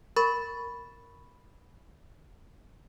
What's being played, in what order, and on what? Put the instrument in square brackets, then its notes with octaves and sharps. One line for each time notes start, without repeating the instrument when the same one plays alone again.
[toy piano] A#4 [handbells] B5 C#6 A6